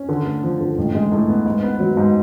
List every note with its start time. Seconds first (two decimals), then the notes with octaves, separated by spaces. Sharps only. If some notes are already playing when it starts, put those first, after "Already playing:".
Already playing: C#4
0.09 D3
0.26 A3
0.43 F3
0.60 D3
0.78 A1
0.94 G#3
1.12 A2
1.29 B3
1.46 G#2
1.63 B3
1.80 F#3
1.97 G#2